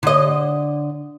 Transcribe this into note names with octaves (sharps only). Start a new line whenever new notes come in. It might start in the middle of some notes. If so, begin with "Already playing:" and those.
D3 D#5